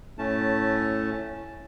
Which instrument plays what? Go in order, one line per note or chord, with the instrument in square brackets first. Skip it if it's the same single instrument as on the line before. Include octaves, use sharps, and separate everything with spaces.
[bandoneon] A2 A3 C#4 A5